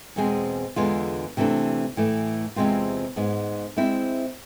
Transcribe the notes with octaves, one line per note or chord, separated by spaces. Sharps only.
E2 B2 G#3 C4 G#4
E2 D3 G#3 B3 F4
C3 E3 A3 D4
A2 E3 A3
E2 C3 G#3 C4 F4
G#2 G#3 B3
G#3 C4 E4